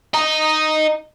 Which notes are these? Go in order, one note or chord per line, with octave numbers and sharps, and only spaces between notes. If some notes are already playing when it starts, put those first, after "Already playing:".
D#5 A#5